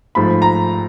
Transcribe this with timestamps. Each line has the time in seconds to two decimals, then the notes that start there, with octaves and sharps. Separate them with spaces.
0.15 G#2 F3 A3 B5
0.42 A#5